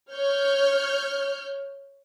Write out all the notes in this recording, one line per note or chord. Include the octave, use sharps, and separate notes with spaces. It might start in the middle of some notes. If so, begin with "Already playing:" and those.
C#5 F6 G6